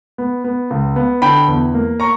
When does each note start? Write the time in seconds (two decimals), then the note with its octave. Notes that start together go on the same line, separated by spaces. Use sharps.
0.18 B3
0.44 B3
0.70 C#2
0.96 B3
1.22 D3 G5 B5
1.48 E2
1.74 A#3
2.00 A#5 C#6